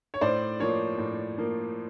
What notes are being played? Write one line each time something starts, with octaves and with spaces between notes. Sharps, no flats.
C#5
A2 C5 D5
F3 A#3 C#5
A2
F3 A#3